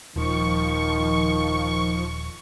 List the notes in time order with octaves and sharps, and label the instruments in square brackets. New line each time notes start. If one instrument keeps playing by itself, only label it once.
[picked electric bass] D#1 [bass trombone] D#3 [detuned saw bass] F3 [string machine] C#6